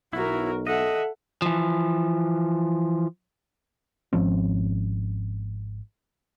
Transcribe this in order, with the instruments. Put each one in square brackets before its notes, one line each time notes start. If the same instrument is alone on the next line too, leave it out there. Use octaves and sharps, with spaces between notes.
[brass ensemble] B1 [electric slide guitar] E4 [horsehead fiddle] F#4 A#4
[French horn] A4 [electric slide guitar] D#5 [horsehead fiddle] E5 F#5
[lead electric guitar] E3 F3
[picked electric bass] G#1 F3 C4 C#4